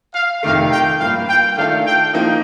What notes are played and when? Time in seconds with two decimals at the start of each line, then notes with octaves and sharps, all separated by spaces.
0.14 F5
0.43 F2 C3 D#3 A3 F5
0.72 G5
0.99 G2 F3 A#3 F5
1.28 G5
1.57 D#3 A3 D4 F4 A4 F5
1.86 G5
2.13 F3 A#3 D#4